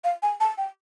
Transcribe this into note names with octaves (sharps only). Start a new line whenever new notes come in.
F5
G#5
A5
G5